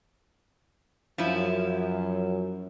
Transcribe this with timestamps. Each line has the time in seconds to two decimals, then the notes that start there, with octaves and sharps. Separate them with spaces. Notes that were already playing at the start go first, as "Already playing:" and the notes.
1.18 F#2 F3 E4